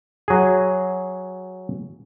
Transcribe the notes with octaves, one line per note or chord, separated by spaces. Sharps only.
F#3 G#4